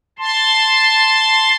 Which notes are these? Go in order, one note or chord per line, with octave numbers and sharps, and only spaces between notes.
A5 C6